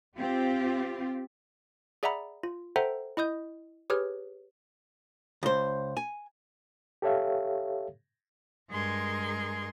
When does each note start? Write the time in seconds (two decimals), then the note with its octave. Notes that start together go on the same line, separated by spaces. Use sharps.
0.17 C4 F4 G4
2.03 G#4 D5 E5 F#5 A#5 B5
2.43 F4
2.76 A4 C5 E5 F#5 G5 A#5
3.17 E4 D#5 D#6 G6
3.90 G4 G#4 B4 C#5 F6
5.43 C#2 C5
5.97 G#5
7.02 G4 A4 C#5 E5 F5
8.70 G2 G#3 G#4 A#4 C6 G#6